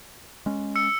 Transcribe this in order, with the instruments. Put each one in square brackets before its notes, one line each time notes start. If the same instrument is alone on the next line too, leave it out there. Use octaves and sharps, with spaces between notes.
[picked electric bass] G#3 C#4
[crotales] E6 C#7